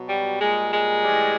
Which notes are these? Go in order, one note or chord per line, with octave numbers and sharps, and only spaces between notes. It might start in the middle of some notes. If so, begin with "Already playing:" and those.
Already playing: B2 F#3
G3
A#2 G3 G#3
G#3
A2 E3 G3